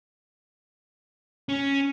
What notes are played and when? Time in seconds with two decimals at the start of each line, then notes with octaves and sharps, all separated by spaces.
1.49 C#4